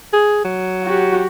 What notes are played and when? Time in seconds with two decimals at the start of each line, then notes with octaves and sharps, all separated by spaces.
0.13 G#4
0.44 F#3
0.83 F#4 G4